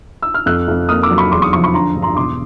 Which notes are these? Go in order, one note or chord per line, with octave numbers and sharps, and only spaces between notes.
E6
F6
F2 E6 F#6
F2
A#3 D#6 F6
D6 E6
F#3
B5 C#6
E2 C6 D6
C#6 D#6
F3 C#6 D#6
B5 C#6
D3 A#5 C6
G2
A#5 C6
E1 C6 D6